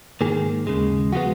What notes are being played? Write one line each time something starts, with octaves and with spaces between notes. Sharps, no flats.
G#2 D#3 A#3 G#4
D#2 C#3 G#3
F3 G#3 B3 F#4